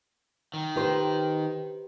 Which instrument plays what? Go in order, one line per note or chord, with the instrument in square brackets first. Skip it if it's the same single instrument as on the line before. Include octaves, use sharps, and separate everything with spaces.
[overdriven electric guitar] D#3
[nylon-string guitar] G4 B4 C5